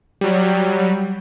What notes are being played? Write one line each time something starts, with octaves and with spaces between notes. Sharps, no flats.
F#3 G3